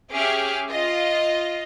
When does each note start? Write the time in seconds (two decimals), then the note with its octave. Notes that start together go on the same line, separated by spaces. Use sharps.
0.14 C#4 G4 G#4 E5 D6 F6
0.70 F4 D#5